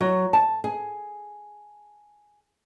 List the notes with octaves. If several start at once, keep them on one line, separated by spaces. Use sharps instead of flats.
F#3
A5
G#4